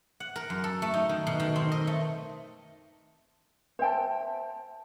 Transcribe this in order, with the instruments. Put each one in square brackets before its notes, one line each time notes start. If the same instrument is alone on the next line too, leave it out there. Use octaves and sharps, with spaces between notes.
[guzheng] F#5
A#4
F#2
A4
A3
D#4
D#3
B2
D#3
C4
D#5
A3
[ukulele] C5 E5 G5 A5